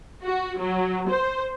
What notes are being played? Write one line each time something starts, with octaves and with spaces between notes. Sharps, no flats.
F#4
F#3
C5